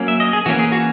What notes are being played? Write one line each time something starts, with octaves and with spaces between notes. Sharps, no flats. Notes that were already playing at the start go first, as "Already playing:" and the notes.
Already playing: F#3 A#3 C#4
E5
D#5
G#4
E3 A#3 C#4 F#4
G#4
F#4